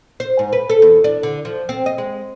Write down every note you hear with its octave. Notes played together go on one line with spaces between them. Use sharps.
C5
G#2
B4
A4
E2
D4
D3
F3
C4
D#5
G#3